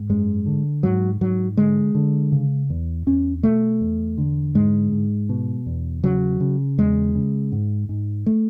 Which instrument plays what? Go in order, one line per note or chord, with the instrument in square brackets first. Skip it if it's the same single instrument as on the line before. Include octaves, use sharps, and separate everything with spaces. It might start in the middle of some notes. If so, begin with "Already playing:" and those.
Already playing: [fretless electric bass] G#2
F#2 G#3
D3
G#2 F#3
G#2 F#3
D3 G#3
D3
C#3
E2
E2 C#4
B2 A3
E2
D3
G#2 G#3
G#2
B2
E2
C#3 F#3
C#3
E2 G#3
C#3
G#2
G#2
A3